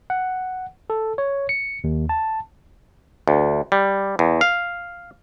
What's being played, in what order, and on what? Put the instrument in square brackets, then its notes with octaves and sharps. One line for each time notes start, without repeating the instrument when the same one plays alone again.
[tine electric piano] F#5
A4
C#5
C#7
D#2
A5
[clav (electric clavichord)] D2
G3
E2
F5